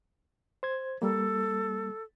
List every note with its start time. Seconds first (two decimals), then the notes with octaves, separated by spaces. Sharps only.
0.63 C5 G#6
1.02 G3 A#3 A4